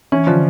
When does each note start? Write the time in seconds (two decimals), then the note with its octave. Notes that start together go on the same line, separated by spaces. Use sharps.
0.12 E3 C#4
0.27 D3 F3